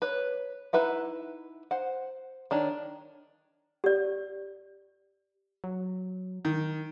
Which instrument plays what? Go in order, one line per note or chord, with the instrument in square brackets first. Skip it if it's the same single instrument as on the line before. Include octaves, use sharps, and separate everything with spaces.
[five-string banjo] B4 C#5
D#4 E4 B4 E5 F#5
C5 F#5
D#3 D4 C#5
[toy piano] G4 D5
[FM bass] F#3
[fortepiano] D#3